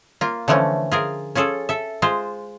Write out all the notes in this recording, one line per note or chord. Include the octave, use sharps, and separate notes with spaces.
A#3 F4
D3 E3 F3 A3 C#4
F4 G#4 A#4
C#4 F4 G#4 A4
A4 E5
G#3 F4 C5